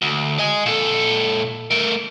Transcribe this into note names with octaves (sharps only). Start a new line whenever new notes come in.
D2
D#5 G#5
A#2 A4
A3 A#4